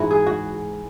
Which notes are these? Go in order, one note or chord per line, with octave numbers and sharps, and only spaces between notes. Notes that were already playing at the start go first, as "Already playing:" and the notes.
Already playing: G#2 E3 E4 F#4
G#4
F#4